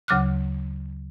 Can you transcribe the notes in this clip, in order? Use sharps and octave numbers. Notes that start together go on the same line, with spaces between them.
D2 C#3 F#3 D6 F6 F#6